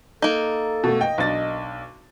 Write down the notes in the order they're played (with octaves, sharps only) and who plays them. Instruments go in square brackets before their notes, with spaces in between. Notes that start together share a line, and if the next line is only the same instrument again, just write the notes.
[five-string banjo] A#3 D#4 [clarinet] A4
[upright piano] B2 A3
[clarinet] D#5 [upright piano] G5
[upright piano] B1 D4 A6